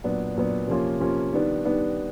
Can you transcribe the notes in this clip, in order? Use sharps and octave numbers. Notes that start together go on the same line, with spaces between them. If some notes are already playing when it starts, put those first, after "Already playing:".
A#2 F#3 B3 D4
A#2 F#3 B3 D4
C3 F3 A#3 C#4 F4
C3 F3 A#3 C#4 F4
D#3 G3 B3 D4
D#3 G3 B3 D4